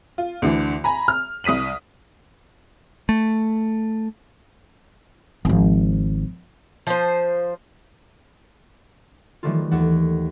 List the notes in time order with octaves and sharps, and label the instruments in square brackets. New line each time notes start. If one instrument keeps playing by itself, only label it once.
[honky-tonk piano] F4
D2 D3 E3
G#5 A#5 B5
F6
C2 D#6 B6 D#7 F#7
[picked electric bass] A3
[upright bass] G#1 F3
[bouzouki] F3 C5
[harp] D#3 E3 F#3 G3 A3 F4
D#2 A4 F#5